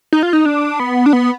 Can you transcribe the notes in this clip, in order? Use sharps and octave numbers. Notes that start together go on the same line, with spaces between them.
D#4
F4
D#4
D4
B3
D4
B3